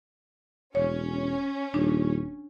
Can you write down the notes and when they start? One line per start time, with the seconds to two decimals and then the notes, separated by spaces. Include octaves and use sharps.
0.75 E1 C#4 C#5
1.74 D#1 D4